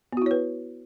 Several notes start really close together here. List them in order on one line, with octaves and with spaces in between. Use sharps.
B3 F#4 E4 C#5 B4